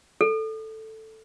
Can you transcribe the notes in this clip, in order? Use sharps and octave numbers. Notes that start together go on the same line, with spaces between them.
A4